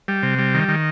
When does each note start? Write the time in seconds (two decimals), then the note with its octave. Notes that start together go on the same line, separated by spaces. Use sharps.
0.08 G3
0.23 C3
0.39 G3
0.54 D#3
0.68 D#3